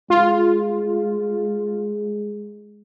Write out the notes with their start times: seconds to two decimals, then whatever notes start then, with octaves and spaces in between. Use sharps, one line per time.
0.10 G#3 F4